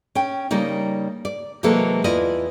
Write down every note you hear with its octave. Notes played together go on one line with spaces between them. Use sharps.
C#4 G5
C#3 G3 A#3 D#4
D5
C3 E3 F#3 G#3 A#3 A4
E2 E4 F4 D5 D#5